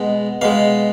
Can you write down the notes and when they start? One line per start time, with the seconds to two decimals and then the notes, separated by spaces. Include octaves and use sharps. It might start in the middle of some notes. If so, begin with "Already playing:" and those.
Already playing: B2 G#3
0.41 B2 G#3 F5